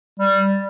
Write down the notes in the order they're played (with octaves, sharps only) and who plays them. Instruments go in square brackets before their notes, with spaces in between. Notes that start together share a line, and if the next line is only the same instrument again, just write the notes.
[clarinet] G3